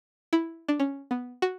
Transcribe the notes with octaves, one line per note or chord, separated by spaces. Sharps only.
E4
D4
C#4
B3
F#4